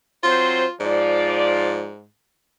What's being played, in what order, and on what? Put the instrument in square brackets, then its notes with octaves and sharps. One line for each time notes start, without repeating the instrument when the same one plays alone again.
[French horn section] F#3 C4 C5 [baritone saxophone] F4
[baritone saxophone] G#2 [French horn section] F3 F4 D5